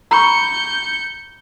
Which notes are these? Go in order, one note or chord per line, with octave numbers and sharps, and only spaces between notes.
A#5 B5 C#6 G6 C#7